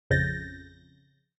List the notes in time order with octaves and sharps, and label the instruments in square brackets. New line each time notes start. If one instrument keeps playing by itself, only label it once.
[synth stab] A1 F2 C#3 G6 A6 A#6